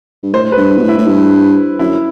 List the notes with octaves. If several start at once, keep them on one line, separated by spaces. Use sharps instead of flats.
G2
A2 C5
B4
G2
B2
A2
E4
A2
G2
F#2 E4